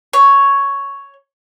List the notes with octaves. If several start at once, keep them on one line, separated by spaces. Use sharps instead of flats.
C#5